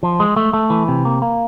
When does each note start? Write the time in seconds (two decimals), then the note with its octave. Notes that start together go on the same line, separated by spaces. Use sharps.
0.03 F3
0.20 G#3
0.36 A3
0.53 A3
0.70 E3
0.88 C3
1.05 A#3
1.22 A#3